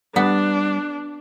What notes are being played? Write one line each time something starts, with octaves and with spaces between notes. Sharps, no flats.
G3 B3 D4